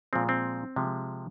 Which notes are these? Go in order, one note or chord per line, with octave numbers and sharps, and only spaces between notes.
A#2 F3 G#3 C4
C4
C3 F3 G#3